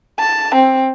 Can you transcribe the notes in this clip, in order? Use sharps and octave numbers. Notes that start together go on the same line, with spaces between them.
A5
C4